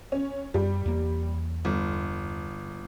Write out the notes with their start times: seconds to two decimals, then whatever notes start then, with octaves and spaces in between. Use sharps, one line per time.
0.12 C#4
0.54 F#2 G3
0.86 E2 A#3
1.65 G1